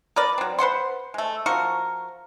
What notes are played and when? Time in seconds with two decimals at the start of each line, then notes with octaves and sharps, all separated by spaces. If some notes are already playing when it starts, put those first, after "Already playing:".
0.16 A#4 B4 D5
0.38 F#3 C4
0.59 B4 C5 F#5 C6
1.14 G#3 A3
1.46 F3 F#4 A#4 C#6